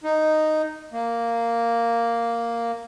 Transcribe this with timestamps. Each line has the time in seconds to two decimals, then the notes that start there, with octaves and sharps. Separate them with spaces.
0.04 D#4
0.92 A#3